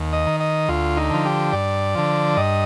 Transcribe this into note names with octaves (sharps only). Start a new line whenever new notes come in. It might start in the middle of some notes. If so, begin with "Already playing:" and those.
Already playing: D#2
D#5
D#3
D#5
D2 F4
D#4
D3 F3
G4
G2 D5
D3 F3
G2 D#5